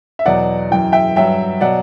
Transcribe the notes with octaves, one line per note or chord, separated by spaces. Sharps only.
E5
E2 B2 F#3 D5 F#5
F#2 E3 G5
E5 G5
G2 F#3 E5 G5
B2 F#3 D5 F#5